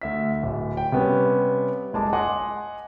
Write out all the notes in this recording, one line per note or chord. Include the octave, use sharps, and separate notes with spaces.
D2 E5 B6
D1
G5
C3 G3 B3 C#4
F#1 G#3 A5 D6
D#5 F#5 G#5 C6 D6